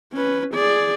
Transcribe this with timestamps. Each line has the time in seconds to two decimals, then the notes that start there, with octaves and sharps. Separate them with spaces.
0.13 C#4 B4
0.55 G#4 D5